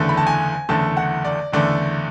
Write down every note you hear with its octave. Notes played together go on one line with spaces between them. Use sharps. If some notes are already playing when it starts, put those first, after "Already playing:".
Already playing: F#1 E2 D3 A3
B5
A5
G#5
F#1 E2 D3 A3 A5
F#5
D5
F#1 E2 D3 A3 D5